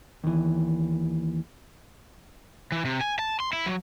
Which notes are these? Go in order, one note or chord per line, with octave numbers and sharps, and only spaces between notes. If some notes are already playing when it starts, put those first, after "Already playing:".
D#2 E3
E3
C3
G#5
A5
C6
E4
F#3